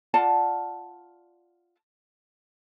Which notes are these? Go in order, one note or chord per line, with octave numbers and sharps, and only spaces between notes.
F4 D5 F#5 A5